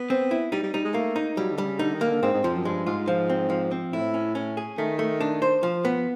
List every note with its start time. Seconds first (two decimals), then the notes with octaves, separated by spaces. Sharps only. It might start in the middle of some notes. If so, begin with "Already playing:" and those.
Already playing: B3
0.10 C4
0.31 E4
0.52 G3 D#4
0.63 G3
0.74 G3 D#4
0.84 G#3
0.94 A3 A#3
1.16 D#4
1.37 F#3 G3
1.52 D3
1.58 G3
1.65 C#3
1.79 D3 D#4
1.94 D#3
2.01 A#3
2.08 D3
2.22 G#2 C4
2.33 G#2
2.44 F2 F3
2.55 F#2
2.65 G2 G#3
2.86 G#2 F4
3.08 F3
3.30 C4
3.50 F3
3.71 C4
3.92 A2 E4
4.14 C#4
4.35 C#4
4.57 G#4
4.78 D#3 A3
4.99 A3
5.20 D4
5.42 C5
5.63 F3
5.85 B3